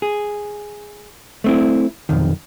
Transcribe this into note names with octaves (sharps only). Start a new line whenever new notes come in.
G#4
A3 C4 E4
B1 F2 D#3